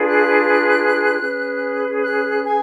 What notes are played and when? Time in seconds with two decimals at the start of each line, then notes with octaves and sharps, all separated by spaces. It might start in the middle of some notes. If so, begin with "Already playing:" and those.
Already playing: D4 F4 G#4 B4
0.08 F#6
1.20 C#4 G#4 B4
2.04 F#6
2.45 G#5